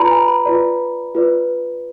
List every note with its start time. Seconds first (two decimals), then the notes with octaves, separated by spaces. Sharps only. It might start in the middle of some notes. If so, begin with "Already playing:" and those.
Already playing: F4 B4 D5 A#5 B5
0.11 G#5
0.28 B5
0.46 F4 B4 D5
1.15 F4 B4 D5